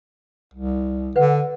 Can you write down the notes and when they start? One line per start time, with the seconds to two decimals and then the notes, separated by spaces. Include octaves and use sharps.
0.54 C2
1.16 D3 B4 F#5